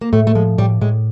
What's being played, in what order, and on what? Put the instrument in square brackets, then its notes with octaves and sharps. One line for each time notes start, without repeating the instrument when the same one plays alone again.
[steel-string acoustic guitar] A#3
[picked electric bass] A2 [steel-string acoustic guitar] A3
[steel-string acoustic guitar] A3
[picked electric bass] F3 [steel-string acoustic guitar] G#3
[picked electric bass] A2 [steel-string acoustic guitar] G3
[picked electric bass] A2 [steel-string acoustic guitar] G#3